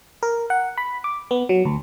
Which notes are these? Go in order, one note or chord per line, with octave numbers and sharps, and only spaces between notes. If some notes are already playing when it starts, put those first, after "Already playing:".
A#4
F#5
B5
D6
B3
F#3
D2